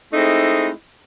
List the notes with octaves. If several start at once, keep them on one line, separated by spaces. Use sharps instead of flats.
G#3 A3 C4 D#4 E4